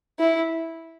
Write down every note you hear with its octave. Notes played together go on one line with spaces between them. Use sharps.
E4